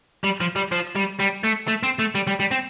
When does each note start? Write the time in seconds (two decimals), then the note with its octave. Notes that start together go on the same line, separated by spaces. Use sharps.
0.24 G3
0.41 F3
0.56 G3
0.72 F3
0.95 G3
1.19 G3
1.44 A3
1.68 A3
1.83 C4
1.99 A3
2.15 G3
2.27 G3
2.40 G3
2.51 C4